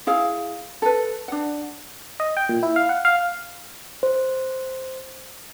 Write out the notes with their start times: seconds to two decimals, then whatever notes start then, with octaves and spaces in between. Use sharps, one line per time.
0.07 E4 G#4 F5
0.82 A4 B4
1.28 D4 F#5
2.20 D#5
2.37 G5
2.49 A#2
2.63 E4
2.76 F5
2.89 F#5
3.05 F5
4.03 C5